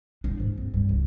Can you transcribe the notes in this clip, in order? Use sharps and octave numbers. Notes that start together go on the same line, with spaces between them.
D4
G#2
C4
G2
C#2